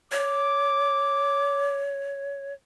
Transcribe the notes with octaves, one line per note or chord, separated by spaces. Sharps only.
C#5 D6